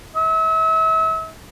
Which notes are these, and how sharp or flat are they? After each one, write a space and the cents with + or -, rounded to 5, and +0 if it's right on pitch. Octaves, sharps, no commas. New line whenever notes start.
E5 -35